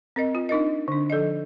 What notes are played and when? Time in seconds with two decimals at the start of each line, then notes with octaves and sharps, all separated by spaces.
0.16 C4 A#4 D#5
0.35 F4
0.49 D4 D#4 A#4 D#5
0.88 D3 D4
1.10 F3 A4 D5 D#5